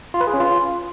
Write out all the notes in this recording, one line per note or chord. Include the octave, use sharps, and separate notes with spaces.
F4
B4
G#4
C#4
F4